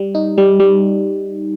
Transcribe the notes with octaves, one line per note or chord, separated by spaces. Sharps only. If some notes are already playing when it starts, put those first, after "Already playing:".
Already playing: G3
D#4
G3
G3